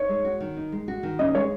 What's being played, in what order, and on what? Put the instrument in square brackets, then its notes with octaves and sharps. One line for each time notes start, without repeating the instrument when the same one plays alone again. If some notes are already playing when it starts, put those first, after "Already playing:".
Already playing: [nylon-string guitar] D#4 [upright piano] C#5
[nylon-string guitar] G#3
F#4
D#3
D#4
G#3
F#4
D#3
[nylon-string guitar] C#4 [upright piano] D#5
[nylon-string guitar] G#3 [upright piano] C#5